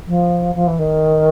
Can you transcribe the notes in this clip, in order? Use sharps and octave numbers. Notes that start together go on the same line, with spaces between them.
F3
F3
E3
D#3